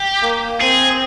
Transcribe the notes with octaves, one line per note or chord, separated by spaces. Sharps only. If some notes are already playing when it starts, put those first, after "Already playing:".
Already playing: G4
A#3
C4 G#4